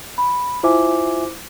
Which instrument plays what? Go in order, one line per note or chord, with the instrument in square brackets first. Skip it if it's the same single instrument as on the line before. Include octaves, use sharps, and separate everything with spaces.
[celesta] B5
[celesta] E4 C5 D6 [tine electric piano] F4 E5 G#5